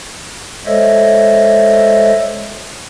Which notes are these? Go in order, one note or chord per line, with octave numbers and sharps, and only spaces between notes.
G#3 A4 C5 C#5 D#5 E5